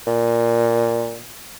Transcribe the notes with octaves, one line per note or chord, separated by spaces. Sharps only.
A#2